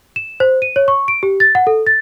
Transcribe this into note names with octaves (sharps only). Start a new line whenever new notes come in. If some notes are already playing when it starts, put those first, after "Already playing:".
E7
C5
D#7
C#5
C#6
D7
G4
A6
F#5
A4
A6